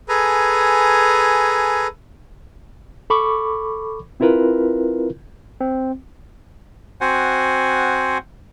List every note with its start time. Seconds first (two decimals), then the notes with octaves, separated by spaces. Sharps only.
0.09 G#4 A4 B4 G#5 A#5
3.10 A4 B5 C#6 D6
4.20 C4 E4 F4 A#4 B4
5.61 C4
7.01 C4 F#4 C5 F#5 G#5